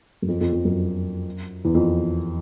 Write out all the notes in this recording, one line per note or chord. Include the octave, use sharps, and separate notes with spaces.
F#2
F2
F2
F2
F#2
E2
F2